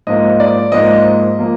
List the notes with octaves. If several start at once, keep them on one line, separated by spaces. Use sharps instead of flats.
G#2 F3 A#3 D#5
D5
G#2 F3 A#3 D#5
F3 A#3